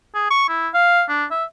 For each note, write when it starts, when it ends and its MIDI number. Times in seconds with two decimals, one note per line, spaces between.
0.15 0.30 68
0.31 0.44 85
0.49 0.69 64
0.74 1.03 77
1.09 1.25 62
1.31 1.44 76